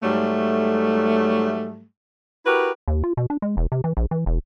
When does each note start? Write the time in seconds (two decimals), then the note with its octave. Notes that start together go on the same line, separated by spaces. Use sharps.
0.03 G#2 F#3 G3 A3
2.45 E4 F#4 G4 A#4 B4
2.88 D#2
3.04 F4
3.17 B2
3.30 D4
3.42 G#3
3.57 E1
3.72 C3
3.84 E3
3.97 A#1
4.11 E3
4.26 E1